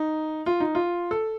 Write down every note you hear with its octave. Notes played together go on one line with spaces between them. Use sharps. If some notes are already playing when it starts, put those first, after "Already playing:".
Already playing: D#4
F4
D#4
F4
A4